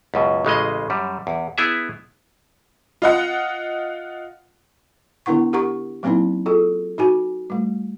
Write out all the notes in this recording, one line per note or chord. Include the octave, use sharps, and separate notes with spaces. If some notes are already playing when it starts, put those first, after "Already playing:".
C#2 F#2 B2
A1 C#3 G#3 D#5
F#2 G3
E2
B3 E4 G#4 E5
F4 D#5 F#5
D3 B3 D4 E4 F#5 C#6
G4 A#4 F#5 A#5 C#6
F#3 A#3 C4 C#4 D#4 E4
F4 G#4 A4
D#4 F#4 G#5
G3 A3